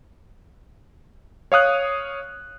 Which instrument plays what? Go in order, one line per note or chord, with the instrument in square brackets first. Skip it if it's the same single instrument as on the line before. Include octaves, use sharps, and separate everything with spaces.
[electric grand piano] C#5 F5 D#6 F#6